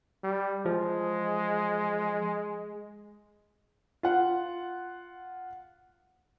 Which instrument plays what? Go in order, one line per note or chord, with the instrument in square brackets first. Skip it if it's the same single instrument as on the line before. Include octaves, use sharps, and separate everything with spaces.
[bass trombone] G3
[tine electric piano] F3 [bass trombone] G#3
[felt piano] F4 F#5